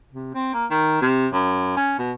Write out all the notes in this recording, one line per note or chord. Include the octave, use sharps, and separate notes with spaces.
C3
C4
A#3
D#3
C3
F#2
C#4
B2